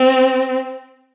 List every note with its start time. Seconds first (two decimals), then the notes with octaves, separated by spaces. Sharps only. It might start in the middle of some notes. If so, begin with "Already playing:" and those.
Already playing: C4